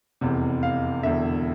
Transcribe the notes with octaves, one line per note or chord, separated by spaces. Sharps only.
F1 E2 C3
F5
E1 E2 D3 E5